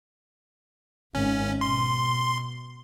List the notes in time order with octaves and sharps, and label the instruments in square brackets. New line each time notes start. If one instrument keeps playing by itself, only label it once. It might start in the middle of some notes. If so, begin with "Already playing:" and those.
[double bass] G#1 [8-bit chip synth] C#4
[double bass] B2 [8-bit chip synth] C6